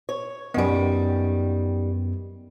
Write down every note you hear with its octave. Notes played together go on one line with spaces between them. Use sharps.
C#5
F#2 D#3 G3 B3